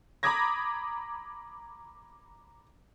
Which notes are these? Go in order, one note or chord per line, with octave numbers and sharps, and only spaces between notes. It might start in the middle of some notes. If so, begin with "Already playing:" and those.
A#5 B5 D6 D#6 G#6 A#6